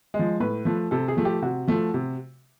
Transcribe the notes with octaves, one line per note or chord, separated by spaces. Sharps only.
G#3
F3
A2 B4
F3 A3
C3 A4
G#4
F3 A3
G4
C3 F#4
F3 A3
C3